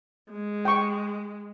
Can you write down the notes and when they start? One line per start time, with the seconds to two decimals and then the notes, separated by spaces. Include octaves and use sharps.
0.31 G#3
0.65 G5 C#6